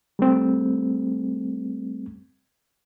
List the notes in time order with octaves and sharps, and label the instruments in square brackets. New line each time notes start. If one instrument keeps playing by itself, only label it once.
[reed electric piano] G3 A3 C4